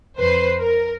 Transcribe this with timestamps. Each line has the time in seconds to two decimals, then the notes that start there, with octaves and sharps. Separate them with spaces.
0.18 F2 B4 C5 C7
0.59 A#4